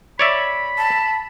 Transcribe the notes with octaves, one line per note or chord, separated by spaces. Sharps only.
C#5 D5 E5 B5
A5